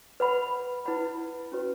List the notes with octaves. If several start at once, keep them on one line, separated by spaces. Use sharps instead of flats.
B4 F#5 B5
E4 B4 F#5 B5
C#4 F#4 B4